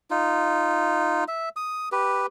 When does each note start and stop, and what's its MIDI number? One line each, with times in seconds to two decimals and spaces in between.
0.10 1.24 63
0.10 1.24 65
1.28 1.49 76
1.56 1.89 87
1.92 2.26 67
1.92 2.26 71